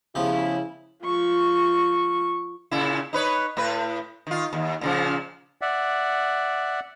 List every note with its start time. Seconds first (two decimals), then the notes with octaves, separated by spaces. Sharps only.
0.15 C#3 F3 B3 E4 G4
1.04 F3 C#6
2.71 A#2 C#3 E4
3.13 D#4 B4 C#5
3.57 A2 B4
4.27 D#3 F4
4.53 D#2
4.81 A#2 C#3 F3
5.62 D5 E5 F#5